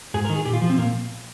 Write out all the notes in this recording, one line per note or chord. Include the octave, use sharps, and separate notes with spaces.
G#2 G#4
A#4
D#3
G#4
A#2 G4
F4
F3
C4
A#2 A#3